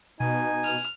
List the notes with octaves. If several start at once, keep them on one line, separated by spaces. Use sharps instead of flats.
B2 D#4 G#5
F6